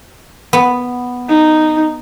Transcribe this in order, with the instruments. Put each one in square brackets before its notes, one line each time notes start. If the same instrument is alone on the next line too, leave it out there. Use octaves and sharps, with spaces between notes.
[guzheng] B3
[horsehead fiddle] D#4